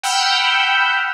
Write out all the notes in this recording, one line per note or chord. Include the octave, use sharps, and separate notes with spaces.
F#5 G5 B5 E6 F6 G6